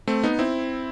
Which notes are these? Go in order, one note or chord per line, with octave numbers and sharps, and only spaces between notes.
A3 C4
B3 D#4
C4 E4